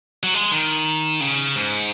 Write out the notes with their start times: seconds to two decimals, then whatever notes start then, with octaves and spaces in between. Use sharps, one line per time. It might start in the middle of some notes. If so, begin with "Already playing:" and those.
0.23 F#3
0.34 G#3
0.52 D#3
1.21 C#3
1.56 G#2